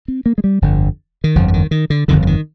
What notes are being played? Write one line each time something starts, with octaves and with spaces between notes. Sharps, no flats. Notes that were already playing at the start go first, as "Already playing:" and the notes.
C4
A#3
G#3
G3
G1 F2 D3
D#3
G1 F2 D3 F3
F3
D#3
D#3
D3
G1 F2 D3 D#3
D3
D#3